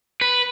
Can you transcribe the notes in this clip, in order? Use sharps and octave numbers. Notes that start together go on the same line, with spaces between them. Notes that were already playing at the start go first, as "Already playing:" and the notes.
B4